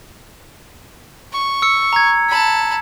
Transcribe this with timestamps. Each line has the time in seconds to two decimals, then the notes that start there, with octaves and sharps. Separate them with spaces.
1.32 C#6
1.62 E6 C#7
1.93 A#5 G#6
2.29 A5 B5